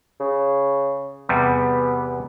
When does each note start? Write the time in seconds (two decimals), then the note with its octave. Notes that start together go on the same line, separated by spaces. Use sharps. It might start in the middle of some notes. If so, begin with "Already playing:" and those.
0.20 C#3
1.29 E2 C3 G3 B3